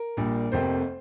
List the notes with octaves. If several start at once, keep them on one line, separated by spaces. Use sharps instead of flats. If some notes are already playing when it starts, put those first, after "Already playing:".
Already playing: A#4
A#1 A#2 G3 D4
F1 F2 C3 A#3 C5